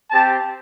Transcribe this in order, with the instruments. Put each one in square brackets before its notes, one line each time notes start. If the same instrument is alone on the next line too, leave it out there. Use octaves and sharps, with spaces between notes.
[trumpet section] C4 G4 A5